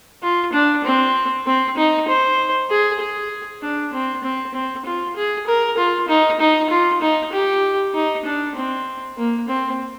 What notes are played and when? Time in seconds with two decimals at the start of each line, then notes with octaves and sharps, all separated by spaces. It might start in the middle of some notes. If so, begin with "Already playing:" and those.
0.22 F4
0.53 D4
0.84 C4
1.46 C4
1.77 D#4
2.08 C5
2.70 G#4
3.00 G#4
3.62 D4
3.93 C4
4.24 C4
4.54 C4
4.85 F4
5.16 G#4
5.47 A#4
5.78 F4
6.08 D#4
6.40 D#4
6.70 F4
7.01 D#4
7.32 G4
7.94 D#4
8.25 D4
8.56 C4
9.17 A#3
9.48 C4